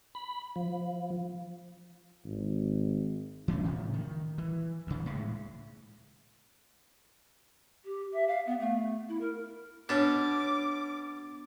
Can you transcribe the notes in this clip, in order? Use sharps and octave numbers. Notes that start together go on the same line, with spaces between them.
B5
F3
G#1
E3 A3 C#4 D4
A2 C#3 F3
D#3
E3
D2 C#3
A2 G#3
G4
E5
F5
B3
A3
E4
A#4
B2 C#4 D4 D6 A6